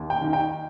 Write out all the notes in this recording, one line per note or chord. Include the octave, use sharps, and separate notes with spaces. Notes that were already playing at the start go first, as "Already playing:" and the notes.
Already playing: D#2
G5
D#3
G5